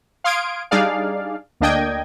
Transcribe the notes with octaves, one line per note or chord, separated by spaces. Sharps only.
F5 C6 D#6 G#6 D7
G3 D4 D#4 G#4 D5 F5
D2 A#3 D4 D#5 G5 G#6